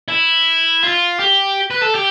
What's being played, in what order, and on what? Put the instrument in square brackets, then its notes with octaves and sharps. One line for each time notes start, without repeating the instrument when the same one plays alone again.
[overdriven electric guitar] E4
F4
G4
B4
A4
G4